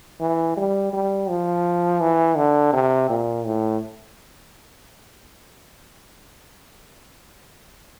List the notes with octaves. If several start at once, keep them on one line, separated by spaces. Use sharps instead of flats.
E3
G3
G3
F3
E3
D3
C3
A#2
A2